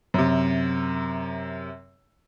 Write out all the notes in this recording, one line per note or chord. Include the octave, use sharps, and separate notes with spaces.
F#2 C3